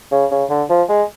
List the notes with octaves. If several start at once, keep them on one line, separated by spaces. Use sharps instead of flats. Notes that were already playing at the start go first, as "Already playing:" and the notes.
C#3
C#3
D3
F3
G#3